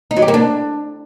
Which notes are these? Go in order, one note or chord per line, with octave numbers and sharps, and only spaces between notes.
D#4
F#3
G4
A#3
D4